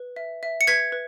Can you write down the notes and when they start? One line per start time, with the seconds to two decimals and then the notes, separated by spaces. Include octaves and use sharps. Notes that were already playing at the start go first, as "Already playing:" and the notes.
Already playing: B4
0.16 E5
0.43 E5
0.61 C#7
0.67 B4 G#6 B6
0.92 B4